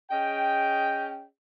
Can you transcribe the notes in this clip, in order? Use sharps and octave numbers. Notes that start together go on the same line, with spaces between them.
C#4 G#4 D#5 G5